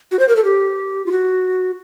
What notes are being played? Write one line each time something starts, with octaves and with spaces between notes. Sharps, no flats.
F#4
C5
A#4
A4
G4
F4
F#4